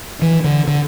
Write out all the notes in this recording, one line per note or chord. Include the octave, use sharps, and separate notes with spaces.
E3
D3
D3